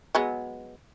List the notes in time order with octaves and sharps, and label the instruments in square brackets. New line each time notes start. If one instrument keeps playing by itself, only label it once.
[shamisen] F#3 G#3 B3